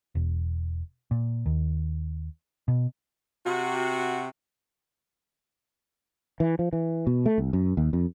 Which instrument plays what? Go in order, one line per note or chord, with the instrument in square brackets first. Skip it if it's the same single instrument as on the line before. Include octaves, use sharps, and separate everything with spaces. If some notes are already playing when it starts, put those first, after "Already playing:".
[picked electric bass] E1
A#2
D#2
B2
[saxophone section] C3 F#4
[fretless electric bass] E3
F3
E3
B2
A3
C2
F#2
D#2
F2